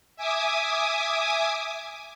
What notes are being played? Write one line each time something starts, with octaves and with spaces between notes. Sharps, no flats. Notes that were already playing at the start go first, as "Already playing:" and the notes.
E5 G#5 D6 D#6